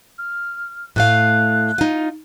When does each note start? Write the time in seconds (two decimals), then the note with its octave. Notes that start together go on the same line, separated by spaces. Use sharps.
0.18 F6
0.96 A2 A3 F5 F#6
1.78 D#4 F4